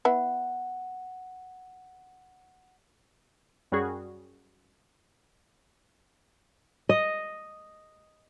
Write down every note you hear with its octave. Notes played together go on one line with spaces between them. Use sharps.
B3 E4 F#5
F#2 G3 C#4 F#4 G#4
D#5